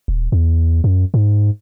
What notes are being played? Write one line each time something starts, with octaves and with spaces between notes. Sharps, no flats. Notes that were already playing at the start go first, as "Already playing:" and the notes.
D#1
E2
F#2
G#2